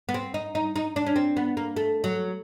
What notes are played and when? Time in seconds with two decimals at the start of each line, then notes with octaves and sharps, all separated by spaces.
0.09 B3
0.14 C4
0.34 D#4
0.55 D#4
0.76 D#4
0.96 D4
1.06 C#4
1.16 C4
1.37 B3
1.57 A#3
1.77 A3
2.04 F#3